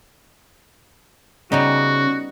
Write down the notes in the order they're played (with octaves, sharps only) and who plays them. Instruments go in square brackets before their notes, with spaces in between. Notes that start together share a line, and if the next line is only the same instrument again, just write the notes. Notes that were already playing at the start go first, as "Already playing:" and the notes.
[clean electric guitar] C#3 [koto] G3 B3 D#4 [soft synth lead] C#4 [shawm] F#4